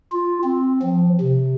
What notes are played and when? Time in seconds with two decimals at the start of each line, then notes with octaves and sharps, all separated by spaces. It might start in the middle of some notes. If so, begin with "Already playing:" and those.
0.12 F4
0.44 C4
0.82 F3
1.21 C3